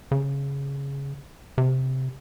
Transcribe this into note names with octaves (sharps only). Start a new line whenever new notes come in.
C#3
C3